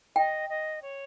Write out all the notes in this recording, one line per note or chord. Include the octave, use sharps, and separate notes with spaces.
D#5 G5
D#5
C#5